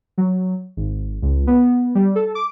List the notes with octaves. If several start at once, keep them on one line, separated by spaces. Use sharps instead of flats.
F#3
G#1
C#2
B3
G3
A4
D6